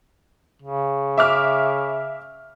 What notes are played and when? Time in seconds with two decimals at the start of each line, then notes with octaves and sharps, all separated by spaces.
0.62 C#3
1.18 E5 D6 F6